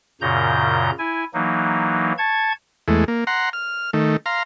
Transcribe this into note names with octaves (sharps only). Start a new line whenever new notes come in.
F#2 A#2 C#3 A#5 G6
E4 G#5
E3 F#3 A#3 D#4
A5 C#6 G#6
E2 G#3 A3
A#3
F#5 A#5 C6
F6
D#3 A3
F5 A#5 C6